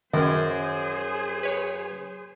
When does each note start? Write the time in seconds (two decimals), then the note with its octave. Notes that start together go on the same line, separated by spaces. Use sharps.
0.14 F#2 D#3 G#4 C5
1.43 B4 C#5